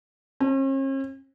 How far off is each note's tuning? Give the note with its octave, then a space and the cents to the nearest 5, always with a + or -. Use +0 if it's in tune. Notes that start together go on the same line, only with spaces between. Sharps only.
C#4 -45